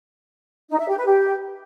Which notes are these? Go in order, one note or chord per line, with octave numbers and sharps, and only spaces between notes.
D#4
E5
G4
B4
G4